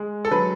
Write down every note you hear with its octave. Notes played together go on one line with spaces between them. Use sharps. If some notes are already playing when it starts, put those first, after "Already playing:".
Already playing: G#3
A4
F#3 B4